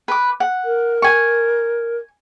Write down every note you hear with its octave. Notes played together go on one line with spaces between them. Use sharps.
B4 D6
F#5
A#4
G#5 C#6